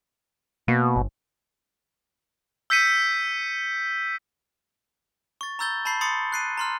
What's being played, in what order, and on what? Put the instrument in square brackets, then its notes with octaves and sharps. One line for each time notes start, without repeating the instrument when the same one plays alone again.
[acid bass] B2 [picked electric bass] A#3
[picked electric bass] G1
[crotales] E6 G6 B6 C#7 D#7
[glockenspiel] C#6 A6
A#5 B5 E6 G6 A6 G7
A5 B5 G6 C7 F#7
B5 C6 D#6 A6 C7 C#7
F#6 C7 D#7
A#5 C6 F6